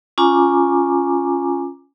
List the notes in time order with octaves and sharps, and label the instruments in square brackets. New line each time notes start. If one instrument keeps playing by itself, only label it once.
[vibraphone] C#4 F4 G#5 A#5 D6